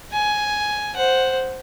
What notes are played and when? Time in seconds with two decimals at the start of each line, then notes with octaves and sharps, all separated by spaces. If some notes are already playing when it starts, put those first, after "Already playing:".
0.12 G#5
0.95 C5 F#5